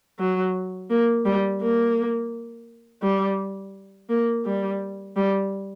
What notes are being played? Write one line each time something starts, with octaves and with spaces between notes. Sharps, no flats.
F#3
A#3
G3
A#3
G3
A#3
G3
G3